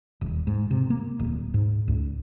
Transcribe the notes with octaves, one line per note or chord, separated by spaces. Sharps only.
D#1
G#2
C3
A#3
D1
G#2
C#2